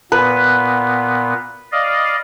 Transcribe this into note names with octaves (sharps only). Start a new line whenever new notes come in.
A#2 B3 B4
D5 D#5 F5